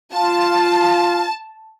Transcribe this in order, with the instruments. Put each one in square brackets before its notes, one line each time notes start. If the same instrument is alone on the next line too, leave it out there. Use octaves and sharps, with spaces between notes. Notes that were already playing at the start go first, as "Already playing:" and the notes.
[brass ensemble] F4 [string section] A5